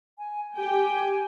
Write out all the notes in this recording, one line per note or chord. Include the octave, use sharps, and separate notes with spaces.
G#5
G4 G5 G#5